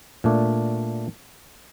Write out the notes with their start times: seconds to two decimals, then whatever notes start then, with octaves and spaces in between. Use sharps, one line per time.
0.24 A#2 A3 D4